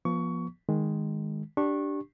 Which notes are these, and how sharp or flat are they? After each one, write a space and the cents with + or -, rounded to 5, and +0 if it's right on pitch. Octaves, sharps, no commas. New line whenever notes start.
F3 +0 B3 -35 C#6 +20
D#3 +0 G#3 +0
D4 +0 G4 -5 C#6 -25